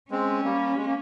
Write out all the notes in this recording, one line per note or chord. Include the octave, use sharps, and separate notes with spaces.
G#3 C4 C#4
G3 A#3
G#3
A#3